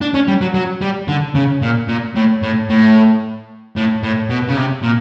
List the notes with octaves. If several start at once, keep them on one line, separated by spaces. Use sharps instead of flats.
D4
C#4
G3
F#3
F#3
G3
D3
C#3
A#2
A#2
A2
A2
A2
A2
A2
B2
C#3
C3
A#2